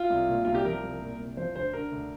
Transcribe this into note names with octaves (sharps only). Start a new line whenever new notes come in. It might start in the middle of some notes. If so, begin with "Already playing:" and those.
Already playing: F4
C2
A#2
C2 F4
G4
F3 A#4
C2
A#2
C2
F3 C5
D2 C5
D3 A#4
D2